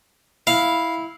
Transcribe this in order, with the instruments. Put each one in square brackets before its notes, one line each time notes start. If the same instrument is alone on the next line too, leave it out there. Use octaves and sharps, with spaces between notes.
[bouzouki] E4 [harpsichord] F5